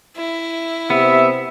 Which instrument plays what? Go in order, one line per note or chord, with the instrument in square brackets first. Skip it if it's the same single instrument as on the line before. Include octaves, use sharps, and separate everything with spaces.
[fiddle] E4
[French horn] C3 [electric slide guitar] B3 [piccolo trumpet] E5